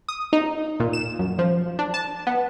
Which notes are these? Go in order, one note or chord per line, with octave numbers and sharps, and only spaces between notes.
D#6
D#4
A#2
E7
F#2
F3
D4
A5
B3